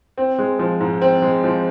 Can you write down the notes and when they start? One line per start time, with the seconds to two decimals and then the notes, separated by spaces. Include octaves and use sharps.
0.18 C4
0.39 G#3
0.59 F3
0.81 G#2
1.02 C4
1.22 G#3
1.44 F3